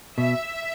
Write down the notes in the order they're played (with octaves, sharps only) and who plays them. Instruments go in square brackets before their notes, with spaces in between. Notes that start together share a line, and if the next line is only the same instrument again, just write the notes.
[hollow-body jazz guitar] B2 [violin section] E5